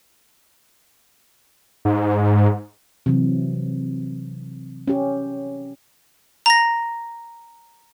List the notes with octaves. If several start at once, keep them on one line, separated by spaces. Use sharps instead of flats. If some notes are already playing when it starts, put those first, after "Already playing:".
G#2
C3 E3 F#3
C#4 G4
A#5 A#6